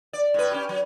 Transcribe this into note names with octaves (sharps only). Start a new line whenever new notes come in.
D5
A2 B4
C#4 G4
F#3